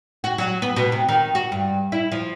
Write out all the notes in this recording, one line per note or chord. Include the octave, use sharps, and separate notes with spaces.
F#4
F#3
B3
B2
C3
D#3
F#4
G2
E4
F3